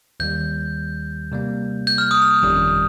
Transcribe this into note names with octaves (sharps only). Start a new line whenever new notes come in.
D#2 D#3 G3 G6
C3 G3 A#3
G6
F6
D#6
F6
G1 F2 D#3 G3 C#4